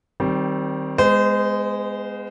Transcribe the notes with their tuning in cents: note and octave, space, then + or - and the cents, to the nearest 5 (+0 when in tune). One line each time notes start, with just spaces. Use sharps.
D#3 -5 G3 -25 C4 +5
G#3 -5 B3 +20 C5 -30